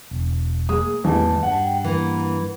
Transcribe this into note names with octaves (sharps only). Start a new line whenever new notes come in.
E1
G#3 A#3 D#6
A1 E2 D#3 G3 A#3 A5
G2 F#5
G5
E3 A#3